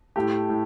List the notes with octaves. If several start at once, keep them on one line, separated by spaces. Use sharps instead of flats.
A2 A3 G4
A2